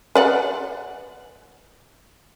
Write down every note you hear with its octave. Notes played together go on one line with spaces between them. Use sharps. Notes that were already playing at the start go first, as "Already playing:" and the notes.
B4 D5 F#5